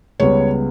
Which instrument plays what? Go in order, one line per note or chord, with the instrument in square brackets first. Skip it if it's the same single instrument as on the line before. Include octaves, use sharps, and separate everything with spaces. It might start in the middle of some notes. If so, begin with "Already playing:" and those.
[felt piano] C#2 C#3 G3 B3 C#5